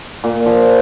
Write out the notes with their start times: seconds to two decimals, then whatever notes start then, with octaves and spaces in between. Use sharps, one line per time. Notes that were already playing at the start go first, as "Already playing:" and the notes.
0.24 A#2
0.46 F3